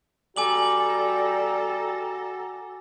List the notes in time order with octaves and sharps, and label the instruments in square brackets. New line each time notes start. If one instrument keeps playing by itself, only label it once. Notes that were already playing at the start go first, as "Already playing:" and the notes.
[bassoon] G3 [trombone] F#4 [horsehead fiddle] A4 A#5 [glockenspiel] G#5 D6 F#7